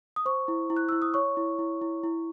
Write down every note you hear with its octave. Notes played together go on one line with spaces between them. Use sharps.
D#6
C5 C#6
E4
E4
F#6
E4 E6
D#6
C#5 C#6
E4
E4
E4
E4